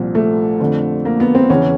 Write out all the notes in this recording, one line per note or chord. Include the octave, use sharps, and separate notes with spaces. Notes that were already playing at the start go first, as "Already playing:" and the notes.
Already playing: C2 A#2 F3
A3
F2 D3 F3
A#3
B3
C4
E2 C#3 E3 C#4